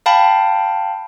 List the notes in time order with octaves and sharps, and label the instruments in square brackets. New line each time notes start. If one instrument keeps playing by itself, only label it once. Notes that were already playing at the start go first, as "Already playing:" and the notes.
[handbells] F5 G5 A5 B5